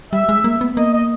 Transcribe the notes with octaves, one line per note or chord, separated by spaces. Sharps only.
G3 E5
G#3
A#3
B3
A#3 D#5
D#5